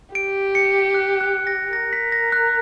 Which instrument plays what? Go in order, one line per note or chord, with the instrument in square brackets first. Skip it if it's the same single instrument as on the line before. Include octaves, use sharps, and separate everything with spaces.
[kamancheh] G4 [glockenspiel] D7
[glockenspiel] C#7
F#6
F#6
A#6
[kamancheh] A#4 [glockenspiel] A#6
[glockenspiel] B6
A#6
F#6